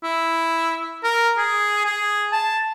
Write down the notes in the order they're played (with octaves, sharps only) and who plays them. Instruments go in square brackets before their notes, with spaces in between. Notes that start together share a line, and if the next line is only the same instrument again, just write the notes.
[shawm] E4
A#4
G#4
G#4
A5